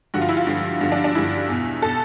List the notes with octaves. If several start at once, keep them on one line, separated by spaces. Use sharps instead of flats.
G2 D3 F3 F#4
F4
E4
F4
G2 D3 F3
G2 D3 F3
D4
D4
G2 D3 F3 E4
E2 B2
B2 A4